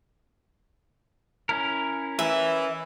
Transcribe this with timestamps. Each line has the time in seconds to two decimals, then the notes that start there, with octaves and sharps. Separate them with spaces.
1.49 C#4 E4 A#4
2.19 E3 E5